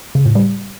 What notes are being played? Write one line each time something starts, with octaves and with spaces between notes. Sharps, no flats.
C#3
A2
G3